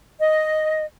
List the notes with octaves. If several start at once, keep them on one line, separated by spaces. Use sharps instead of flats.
D#5